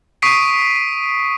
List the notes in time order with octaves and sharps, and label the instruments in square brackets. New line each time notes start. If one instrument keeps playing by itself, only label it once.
[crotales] C#6 D#6 B6 C7 D7 D#7